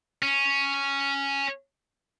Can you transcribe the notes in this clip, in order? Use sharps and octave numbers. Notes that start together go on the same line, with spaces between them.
C#4